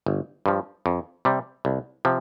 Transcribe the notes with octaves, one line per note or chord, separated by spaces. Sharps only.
G1
G2 F3
F2
C3 G3
C2
C3 F3